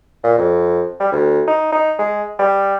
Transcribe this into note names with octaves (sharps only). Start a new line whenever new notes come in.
A#2
F2
G3
D2
D#4
D#4
G#3
G3